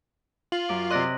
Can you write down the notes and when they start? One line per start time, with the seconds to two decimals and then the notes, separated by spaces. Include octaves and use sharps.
0.52 F4 F#7
0.69 F#2 D6
0.91 C3 D5 D#5 C6 F#6 A#6